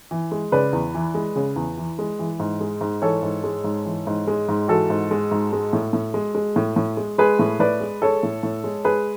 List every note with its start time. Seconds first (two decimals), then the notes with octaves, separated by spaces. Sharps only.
0.11 E3
0.32 G#3
0.52 C#3 B4 D5
0.73 E2
0.94 E3
1.15 G#3
1.36 C#3
1.56 E2
1.78 E3
1.99 G#3
2.19 E3
2.40 G#2
2.61 G#3
2.81 G#2
3.02 E3 A4 C#5
3.22 G#2
3.44 G#3
3.64 G#2
3.86 E3
4.07 G#2
4.28 G#3
4.49 G#2
4.68 E3 F#4 A4
4.90 G#2
5.11 G#3
5.31 G#2
5.53 G#3
5.73 A2
5.93 A2
6.14 G#3
6.35 G#3
6.56 A2
6.76 A2
6.97 G#3
7.18 G#3 G#4 B4
7.39 A2
7.60 A2 B4 D5
7.81 G#3
8.02 G#3 A4 C#5
8.23 A2
8.43 A2
8.64 G#3
8.84 G#3 G#4 B4